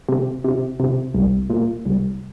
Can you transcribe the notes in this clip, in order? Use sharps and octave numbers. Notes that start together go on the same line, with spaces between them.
C3
C3
C3
C2
A#2
C2